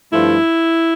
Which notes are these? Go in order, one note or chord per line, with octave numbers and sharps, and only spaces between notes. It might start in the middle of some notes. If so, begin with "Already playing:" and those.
G2 F3 A3 E4